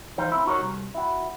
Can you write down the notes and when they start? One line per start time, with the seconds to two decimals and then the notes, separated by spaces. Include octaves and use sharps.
0.18 E3 D#4 C5 F5
0.32 C4 E4
0.46 D#4 F#4 A#4 C#5
0.61 C2
0.95 E4 F#4